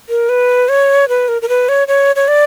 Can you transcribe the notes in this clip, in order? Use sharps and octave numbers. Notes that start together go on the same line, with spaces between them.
A#4
B4
C#5
B4
A#4
A#4
B4
C#5
C#5
C#5
D5